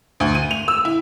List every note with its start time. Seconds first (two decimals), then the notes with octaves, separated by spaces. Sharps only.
0.20 D2
0.35 D#7
0.51 F7
0.68 E6
0.85 E4